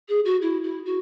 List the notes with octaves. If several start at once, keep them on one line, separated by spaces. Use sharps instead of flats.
G#4
F#4
E4
E4
F#4